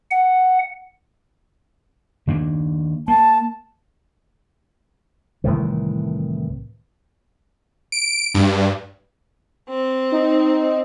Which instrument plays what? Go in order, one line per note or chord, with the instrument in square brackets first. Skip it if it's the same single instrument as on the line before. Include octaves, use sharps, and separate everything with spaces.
[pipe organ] F#5
[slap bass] D#3 A#3 D4
[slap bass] A#3 [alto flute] A5
[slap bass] C2 A2 D#3 E3
[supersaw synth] D7
G2
[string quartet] C4
[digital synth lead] D#4